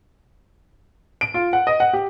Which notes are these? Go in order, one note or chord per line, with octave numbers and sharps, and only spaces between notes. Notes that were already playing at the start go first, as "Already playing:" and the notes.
D7
F4
F#5
D#5
F#5
G4